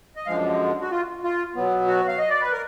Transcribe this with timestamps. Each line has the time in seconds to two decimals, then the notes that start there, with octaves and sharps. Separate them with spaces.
0.16 D#5
0.26 F#2 D3 F3 G#3 F5
0.81 F#4
0.91 F4
1.24 F4
1.55 B2 F#3 B3
1.88 F#4
2.08 F5
2.19 D#5
2.30 D5
2.41 B4
2.52 A#4